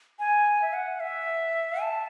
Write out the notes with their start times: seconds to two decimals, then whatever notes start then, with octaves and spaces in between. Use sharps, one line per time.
0.19 G#5
0.62 E5
0.73 F#5
1.00 E5
1.82 A5